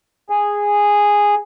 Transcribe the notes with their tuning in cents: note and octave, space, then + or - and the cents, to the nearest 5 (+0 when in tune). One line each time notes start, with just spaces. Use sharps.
G#4 -10